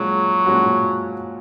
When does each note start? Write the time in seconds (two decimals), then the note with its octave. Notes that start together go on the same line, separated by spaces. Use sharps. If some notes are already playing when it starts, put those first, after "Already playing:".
Already playing: A#2 F3 F#3 G#3 C#4 F#4
0.46 A#2 F3 G#3 C#4 F#4